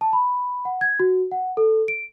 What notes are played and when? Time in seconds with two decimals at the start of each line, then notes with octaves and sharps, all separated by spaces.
0.01 A5
0.13 B5
0.65 F#5
0.81 G#6
1.00 F#4
1.31 F#5
1.57 A4
1.88 D7